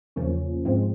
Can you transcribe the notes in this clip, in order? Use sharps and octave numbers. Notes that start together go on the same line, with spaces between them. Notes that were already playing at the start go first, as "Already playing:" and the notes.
E2 C#3 F3 A#3 C#4
G#2 F3 G#3 C4